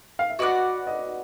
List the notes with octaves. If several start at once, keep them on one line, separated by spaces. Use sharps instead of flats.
F5
E5
F#4 B4 D5 D#5 F#5
D#5